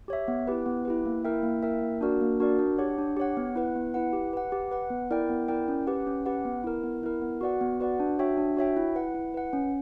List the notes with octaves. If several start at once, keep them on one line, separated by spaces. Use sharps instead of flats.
G4 C#5 E5
B3
E4 G4 B4
B3
E4 G4 B4
A#3
E4 A#4 E5 G5
A#3
E4 A#4 E5 G5
A#3
D4 F#4 A#4 D5
A#3
D4 F#4 A#4 D5
D4
G4 C#5 F#5
D4
G4 C#5 F#5
B3
E4 B4 F#5
B3
E4 B4 F#5
G4
B4 F#5
G4
B4 F#5
B3
E4 A#4 D5 G5
B3
E4 A#4 D5 G5
C#4
G4 B4 F#5
C#4
G4 B4 F#5
B3
E4 A#4
B3
E4 A#4
B3
F#4 B4 D5 F#5
B3
F#4 B4 D5 F#5
D4
F#4 C#5 E5 G5
D4
F#4 C#5 E5 G5
E4
B4 F#5
E4
B4 F#5
C#4